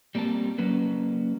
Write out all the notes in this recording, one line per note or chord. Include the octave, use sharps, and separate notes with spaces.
G3 A#3 C4 A#4 A5
F#3 A#3 C#4 B4